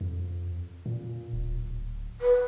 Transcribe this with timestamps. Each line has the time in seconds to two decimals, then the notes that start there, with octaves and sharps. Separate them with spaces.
0.01 F2
0.86 A#2
1.33 D1
2.21 B4